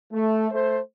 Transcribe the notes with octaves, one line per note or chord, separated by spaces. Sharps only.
A3
A3 C5